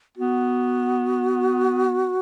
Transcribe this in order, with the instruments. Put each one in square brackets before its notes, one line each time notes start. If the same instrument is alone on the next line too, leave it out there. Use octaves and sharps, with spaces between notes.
[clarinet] B3 [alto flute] F#4